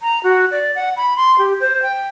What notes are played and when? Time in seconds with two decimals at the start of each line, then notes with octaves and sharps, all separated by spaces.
0.01 A#5
0.24 F#4
0.51 D5
0.76 F#5
0.97 B5
1.16 C6
1.39 G4
1.60 C5
1.83 G5